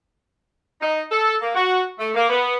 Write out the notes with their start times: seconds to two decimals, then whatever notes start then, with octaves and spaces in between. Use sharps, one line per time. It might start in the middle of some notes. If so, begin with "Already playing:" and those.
0.81 D#4
1.10 A4
1.41 A#3
1.55 F#4
1.99 A3
2.15 A#3
2.29 B3